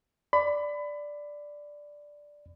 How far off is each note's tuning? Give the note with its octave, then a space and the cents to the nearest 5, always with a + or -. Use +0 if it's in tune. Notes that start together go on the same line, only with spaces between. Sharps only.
D5 +0 B5 +25